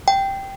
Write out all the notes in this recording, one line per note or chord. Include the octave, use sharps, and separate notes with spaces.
G5